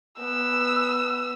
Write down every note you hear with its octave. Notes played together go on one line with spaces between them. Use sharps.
B3 E6